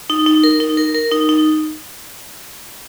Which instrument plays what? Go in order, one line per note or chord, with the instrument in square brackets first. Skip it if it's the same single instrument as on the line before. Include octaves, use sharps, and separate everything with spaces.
[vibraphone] D#4
D#4
A#4
D#4
A#4
A#4
D#4
D#4